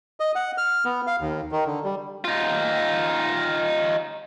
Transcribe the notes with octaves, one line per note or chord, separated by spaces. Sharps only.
D#5
F#5
F6
B3
F5
D#2
D#3
D3
G3
D#4 F4